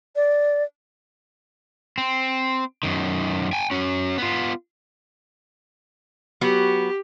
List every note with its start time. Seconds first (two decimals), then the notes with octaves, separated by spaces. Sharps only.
0.16 D5
1.98 C4
2.83 F#2 D#3
3.53 G5 G#5
3.71 C#4 F#4
4.18 B3 F4
6.41 F#3 B3 F#4 G4